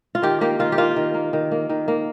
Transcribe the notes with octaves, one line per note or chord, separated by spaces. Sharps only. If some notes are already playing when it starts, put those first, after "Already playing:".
F4
D#3 G4
A#3 G4
D#3 F4
G4
A#3 F4
D#3
A#3
D#3
A#3
D#3
A#3